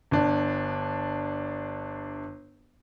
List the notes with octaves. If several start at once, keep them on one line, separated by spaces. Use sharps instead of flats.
G1 D4